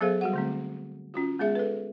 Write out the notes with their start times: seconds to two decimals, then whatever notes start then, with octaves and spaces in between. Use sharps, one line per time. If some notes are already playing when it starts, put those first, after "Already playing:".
0.01 F#3 B3 G#4 A4 C5 F5
0.21 G3 F#4 F#5
0.33 D3 A3 C4
1.14 C#4 F4 F#4
1.39 G#3 B3 G#4 E5
1.55 A4 B4